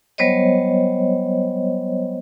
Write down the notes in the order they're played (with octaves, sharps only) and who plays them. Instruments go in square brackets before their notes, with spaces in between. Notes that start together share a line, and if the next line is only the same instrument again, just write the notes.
[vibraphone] F#3 G3 B3 C5 C#5 D#5